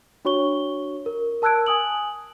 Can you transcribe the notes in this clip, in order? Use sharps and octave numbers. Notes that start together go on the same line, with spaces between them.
D4 F#4 C#5 C#6 G7
A#4
A#4 A5 E6 F#6 G#6 D7
G#5 D#6 F#7